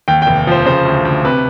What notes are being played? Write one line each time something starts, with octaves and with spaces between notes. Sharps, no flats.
D#2 G5
G5
F1
F3 C5
C#3 C5
D2
D2
C3 B4